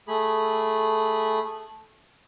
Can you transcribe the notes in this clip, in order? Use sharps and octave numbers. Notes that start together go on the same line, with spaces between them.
A3 G#4 B5